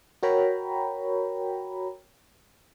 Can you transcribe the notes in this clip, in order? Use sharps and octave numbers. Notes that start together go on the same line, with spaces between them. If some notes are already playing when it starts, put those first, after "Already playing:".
F#4 A#4 C#5 G5 A#5 B5